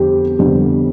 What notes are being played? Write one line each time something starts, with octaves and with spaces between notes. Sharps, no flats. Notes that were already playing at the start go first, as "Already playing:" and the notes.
Already playing: F2 D3 G3 B3 G4
F2 D3 G3 B3